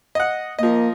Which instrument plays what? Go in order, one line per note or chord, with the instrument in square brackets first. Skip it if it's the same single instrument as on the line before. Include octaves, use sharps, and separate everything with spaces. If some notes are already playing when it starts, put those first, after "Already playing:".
[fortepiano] D#5 F#5
[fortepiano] F3 D#5 [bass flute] A#3